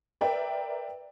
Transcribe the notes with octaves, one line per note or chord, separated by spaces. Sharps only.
A#4 B4 D5 E5 G5 A#5